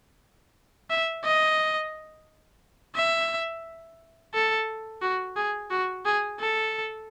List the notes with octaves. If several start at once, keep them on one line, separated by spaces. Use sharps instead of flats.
E5
D#5
E5
A4
F#4
G#4
F#4
G#4
A4